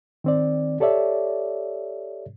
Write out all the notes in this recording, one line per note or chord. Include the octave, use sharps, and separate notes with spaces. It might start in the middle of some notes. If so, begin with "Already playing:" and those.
D#3 C4 D5
G4 A4 C#5 D5 E5